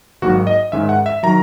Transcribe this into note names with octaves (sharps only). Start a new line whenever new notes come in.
G#1 G#2 F#3 A#3 F#4
D#5
G#2 D#3 G#3 C#4 E5
F#5
E5
D#3 F#3 A#5